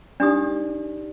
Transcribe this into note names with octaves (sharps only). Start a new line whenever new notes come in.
D4 D#4 G4 D5 D#6